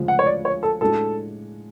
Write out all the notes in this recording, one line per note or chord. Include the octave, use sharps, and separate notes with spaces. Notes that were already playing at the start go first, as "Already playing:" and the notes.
Already playing: D2 C#3 F3 G#3
F#5
C#5
D5
C#5
A4
A2 G#3 D4 F#4 A4